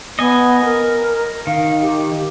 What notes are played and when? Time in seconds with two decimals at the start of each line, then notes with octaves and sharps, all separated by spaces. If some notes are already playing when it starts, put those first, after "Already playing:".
0.19 B3 D#5 G#5
0.64 A#4
1.47 D#3 F5
1.82 G4